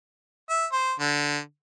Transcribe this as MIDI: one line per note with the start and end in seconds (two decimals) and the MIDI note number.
0.50 0.66 76
0.72 0.93 72
1.00 1.38 50